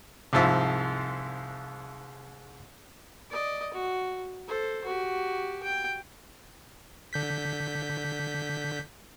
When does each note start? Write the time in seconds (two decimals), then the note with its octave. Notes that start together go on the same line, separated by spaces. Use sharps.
0.33 C2 G#2 F3 E5
3.30 D5 D#5
3.73 F#4
4.48 A4 C5
4.85 F#4 G4
5.63 G5
7.13 D3 G6 B6